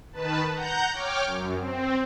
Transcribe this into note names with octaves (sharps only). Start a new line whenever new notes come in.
D#3 B4 A5
F#5 A#5 G6
C#5 G5 D6 F6
F#2
C4